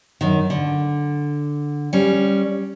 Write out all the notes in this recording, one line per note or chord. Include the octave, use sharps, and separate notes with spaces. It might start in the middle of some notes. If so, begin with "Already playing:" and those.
F#2 D#3
D3
G3 C#4